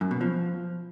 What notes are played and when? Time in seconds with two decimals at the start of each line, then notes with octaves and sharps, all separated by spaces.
0.01 F#2
0.11 B2
0.21 F3